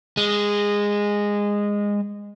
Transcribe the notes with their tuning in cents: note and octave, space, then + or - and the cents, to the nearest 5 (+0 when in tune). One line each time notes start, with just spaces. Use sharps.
G#3 -15